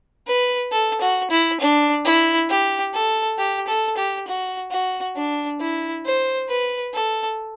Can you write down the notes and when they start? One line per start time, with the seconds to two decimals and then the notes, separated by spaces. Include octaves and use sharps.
0.27 B4
0.72 A4
1.01 F#4
1.31 E4
1.60 D4
2.05 E4
2.49 G4
2.94 A4
3.38 G4
3.68 A4
3.97 G4
4.28 F#4
4.71 F#4
5.16 D4
5.60 E4
6.05 C5
6.49 B4
6.94 A4